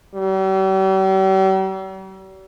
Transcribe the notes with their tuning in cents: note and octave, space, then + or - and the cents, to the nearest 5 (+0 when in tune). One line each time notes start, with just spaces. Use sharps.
G3 -45